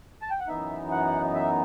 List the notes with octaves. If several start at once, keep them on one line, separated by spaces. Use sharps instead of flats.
A5
G5
F#5
F#2 E3 B3 D#4 E5
F#5
E5